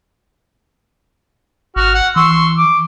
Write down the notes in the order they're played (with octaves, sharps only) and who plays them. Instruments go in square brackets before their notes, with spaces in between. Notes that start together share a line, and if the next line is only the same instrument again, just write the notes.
[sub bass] G#1 [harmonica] F#4 F6
[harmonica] F#5
[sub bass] E3 [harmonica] C6 C#6 E6
[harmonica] D6